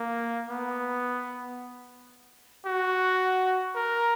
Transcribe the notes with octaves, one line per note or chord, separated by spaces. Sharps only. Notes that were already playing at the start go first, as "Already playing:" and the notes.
Already playing: A#3
B3
F#4
A#4